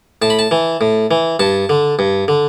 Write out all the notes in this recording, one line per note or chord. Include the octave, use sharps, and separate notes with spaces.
A2 A5
B5
A5
E3
A2
E3
G2 A5
D3
G2
D3